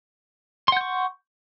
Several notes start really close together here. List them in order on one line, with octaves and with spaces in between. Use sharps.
C6 F#5 G6 C#6